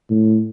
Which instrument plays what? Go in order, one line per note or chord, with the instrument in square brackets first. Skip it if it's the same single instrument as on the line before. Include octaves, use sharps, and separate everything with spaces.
[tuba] A2